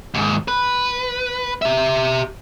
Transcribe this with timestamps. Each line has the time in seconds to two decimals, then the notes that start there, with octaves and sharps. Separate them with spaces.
0.14 D#2 G#2
0.48 B4
1.62 G4 E5